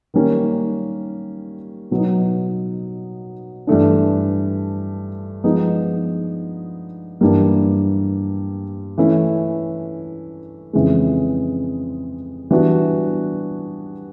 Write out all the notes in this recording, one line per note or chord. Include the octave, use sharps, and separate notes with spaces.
D#3 G3 A#3 C#4
B2 F#3 B3 D#4
G2 E3 A3 D4
F3 G#3 B3 D#4
G2 E3 G3 A#3
E3 A3 C#4 E4
F2 C#3 E3 G#3
E3 G3 B3 D4 F#4